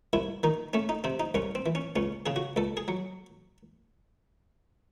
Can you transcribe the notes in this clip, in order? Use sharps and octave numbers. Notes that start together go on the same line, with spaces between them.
C2 E4
D#3 D#4
A3 C#4
D#4
C3 C4
D#4
C2 C#4
C4
E3
C#4
C#2 C#4
C#3 G#4
F#4
C#2 A4
G#4
F#3